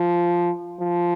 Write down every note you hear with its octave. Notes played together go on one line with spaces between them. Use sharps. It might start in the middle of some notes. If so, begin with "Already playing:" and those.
Already playing: F3
F3